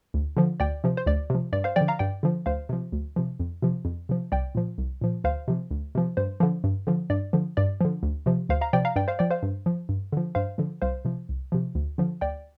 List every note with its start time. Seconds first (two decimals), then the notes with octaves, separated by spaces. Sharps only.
0.14 D2
0.37 D3 F3
0.60 D2 D5 G5
0.84 C3 F3
0.97 C5
1.06 D2 D5
1.30 C3 F3
1.53 G2 D5
1.64 C5 F5
1.76 D3 F3 D5 G5
1.88 F5 A#5
1.99 G2 D5 G5
2.23 D3 F3
2.46 D2 C5 F5
2.69 C3 F3
2.92 D2
3.16 C3 F3
3.40 F2
3.62 C3 F3
3.85 F2
4.09 C3 F3
4.32 C2 D5 G5
4.55 A#2 F3
4.78 C2
5.01 A#2 F3
5.24 D2 C5 F5
5.48 C3 F3
5.71 D2
5.95 C3 F3
6.17 G2 C5
6.40 D3 F3
6.64 G2
6.87 D3 F3
7.10 G2 D5
7.33 D3 F3
7.57 G2 D5
7.81 D3 F3
8.03 D2
8.26 C3 F3
8.49 D2 C5 F5
8.61 F5 A#5
8.73 C3 F3 D5 G5
8.85 F5 A#5
8.96 G2 D5 G5
9.08 C5 F5
9.19 F3 D5 G5
9.31 C5 F5
9.43 G2
9.66 F3
9.89 G2
10.13 D3 F3
10.35 G2 C5 F5
10.58 D3 F3
10.82 C2 C5 F5
11.05 C3 F3
11.29 C2
11.52 C3 F3
11.75 D2
11.98 D3 F3
12.21 D2 D5 G5